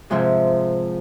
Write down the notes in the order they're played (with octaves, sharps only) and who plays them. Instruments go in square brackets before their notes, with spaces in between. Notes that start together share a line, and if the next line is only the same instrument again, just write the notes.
[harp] G#2 C3 F3 G#3